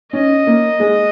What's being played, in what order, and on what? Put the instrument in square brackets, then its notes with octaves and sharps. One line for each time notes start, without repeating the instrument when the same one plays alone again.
[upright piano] C#4 [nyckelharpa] D#5
[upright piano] A#3
G#3